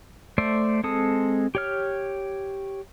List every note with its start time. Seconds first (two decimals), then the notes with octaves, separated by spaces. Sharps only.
0.38 A3 C5 D5 E5
0.84 G#3 C4 A4 A5 D#6
1.55 G4 C#5 F6